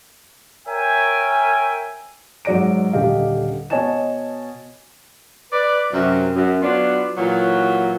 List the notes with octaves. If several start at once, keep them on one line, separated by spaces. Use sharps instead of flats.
A#4 C#5 E5 G5 G#5
G#2 F#3 D5 A#6 D7
D#1 D3 G4 D#5 F5
B2 C#5 D#5 G#5 A5 E7
B4 D5
F#2 C3
F#2
F#3 B3 D4 F4
A#2 E3 F#3